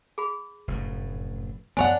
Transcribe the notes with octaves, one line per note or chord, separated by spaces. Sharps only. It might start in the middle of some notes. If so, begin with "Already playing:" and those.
G#4 B5
F1 F#2 A2
F#2 F3 B3 D4 C#5 F#5 G#5